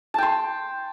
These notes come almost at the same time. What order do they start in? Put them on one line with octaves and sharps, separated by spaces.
A5 G5 C6